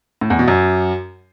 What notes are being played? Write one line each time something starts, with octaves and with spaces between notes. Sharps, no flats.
A2
E2
B2
F#2